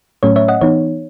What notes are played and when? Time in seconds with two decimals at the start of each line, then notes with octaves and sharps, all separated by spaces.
0.23 A2 F#3 A3 C#4 C#5
0.36 C#5 E5
0.48 D#5 F#5
0.61 E3 B3 D#4 C#5